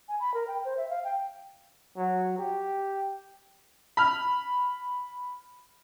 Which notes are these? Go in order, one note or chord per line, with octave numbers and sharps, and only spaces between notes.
G#5
B5
A#4
G5
C5
E5
F5
G5
F#3
G4
B5 F6